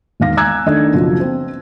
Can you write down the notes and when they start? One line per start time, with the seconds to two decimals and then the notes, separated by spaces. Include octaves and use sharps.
0.20 E1 D#3 F5 A#6
0.37 G#5 A#5 E6 F#6 G#6
0.66 D#3 A3 D4 D#5
0.92 F#1 B2 F3
1.20 C4 C5